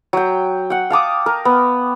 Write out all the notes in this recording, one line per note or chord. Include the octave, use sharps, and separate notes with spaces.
F#3 G5
F#5 G5
F5 A5 D6 D#6
A#4
B3